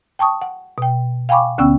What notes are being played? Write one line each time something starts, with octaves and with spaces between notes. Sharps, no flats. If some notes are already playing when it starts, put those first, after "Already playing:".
G5 A5 C#6 D#6
F#5
B2 G5
F5 G5 G#5 B5 C#6 D6
D2 D3 B3 C#4 G5 E6